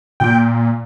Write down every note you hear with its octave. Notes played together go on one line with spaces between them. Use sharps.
A#2 G5